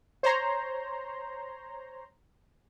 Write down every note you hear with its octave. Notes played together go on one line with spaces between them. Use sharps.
C5 C#5 A#5 C6